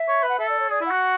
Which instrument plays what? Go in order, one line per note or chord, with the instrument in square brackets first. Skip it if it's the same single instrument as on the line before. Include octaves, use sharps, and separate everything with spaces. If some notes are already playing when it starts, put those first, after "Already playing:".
Already playing: [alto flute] E5
[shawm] C#5
B4
[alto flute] F#5
[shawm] A4 [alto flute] E5
[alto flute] D5
C#5
[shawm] G#4 [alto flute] D5
[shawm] E4
[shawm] F#4 [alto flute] F#5